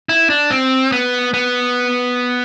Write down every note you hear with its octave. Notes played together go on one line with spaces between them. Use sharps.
E4
D4
C4
B3
B3